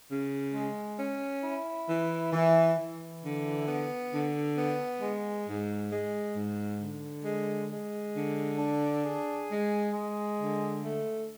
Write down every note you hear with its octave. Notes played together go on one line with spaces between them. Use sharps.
C#3
G#3
C#4
E4
E3
E3
E3
D3
B3
D3
B3
G#3
G#2
G#3
G#2
D3
G#3
G#3
D3
D4
G#4
G#3
G#3
D3
A3